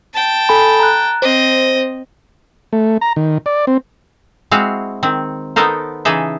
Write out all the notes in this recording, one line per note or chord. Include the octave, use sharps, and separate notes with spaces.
G5 A5
A4 G#5 B5
A#5 F#6
C4 C5 D#5
A3
A#5
D#3
D5
C4
G#3 C4 E4 F#4 F5
D#3 C4
B3 D#4 A4 A#4 C5
C#3 E3 D#4 G#4 A4 E5